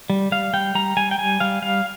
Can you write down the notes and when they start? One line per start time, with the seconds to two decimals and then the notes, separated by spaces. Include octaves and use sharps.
0.10 G3
0.32 G3 F5
0.53 G3 G5
0.75 G3 A#5
0.97 G3 G#5
1.11 G5
1.18 G3 G#5
1.40 G3 F5
1.62 G3 F5